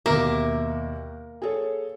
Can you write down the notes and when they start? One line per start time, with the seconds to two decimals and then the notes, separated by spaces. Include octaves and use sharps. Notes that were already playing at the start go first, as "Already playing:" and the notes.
0.06 D#2 B2 A#3 E5 D6
1.42 G#4 A4 C#5